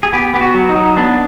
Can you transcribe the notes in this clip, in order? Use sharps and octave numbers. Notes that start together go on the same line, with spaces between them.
G#4
B3 G4
B3 G4
F#4
F#3
D#4
F#3
B3 D4